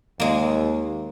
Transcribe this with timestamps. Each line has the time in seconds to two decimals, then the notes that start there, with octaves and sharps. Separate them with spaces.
0.20 D#2 G#3 A#3